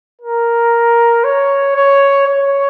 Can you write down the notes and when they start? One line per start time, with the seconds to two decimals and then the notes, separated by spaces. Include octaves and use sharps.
0.22 A#4
1.24 C#5
1.76 C#5
2.27 C#5